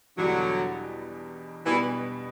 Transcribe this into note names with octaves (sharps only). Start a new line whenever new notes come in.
E2 B2 D3 F#3 G3 D4
B2 E3 G3 B3 D4